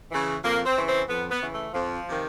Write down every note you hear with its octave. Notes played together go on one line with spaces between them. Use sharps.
C#3 E3
F2 A#3
C4
C#3 E3
C4
F2 B3
B3
C#3 E3
A3
F2 F3
C3 D#3